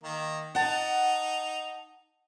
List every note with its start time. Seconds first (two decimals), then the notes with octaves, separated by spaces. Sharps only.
0.03 D#3 A#3
0.55 D#4 F#5 A5